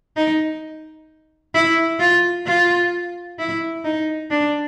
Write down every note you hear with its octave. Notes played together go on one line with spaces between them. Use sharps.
D#4
E4
F4
F4
E4
D#4
D4